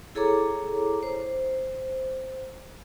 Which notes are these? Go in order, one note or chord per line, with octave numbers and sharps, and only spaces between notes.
E4 G#4 A4 C#5 A#5 D6
C5